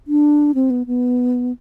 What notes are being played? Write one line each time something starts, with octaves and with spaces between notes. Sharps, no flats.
D4
C4
B3
B3